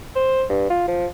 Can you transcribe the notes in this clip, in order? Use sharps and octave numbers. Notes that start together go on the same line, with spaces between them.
C5
G2
F4
F3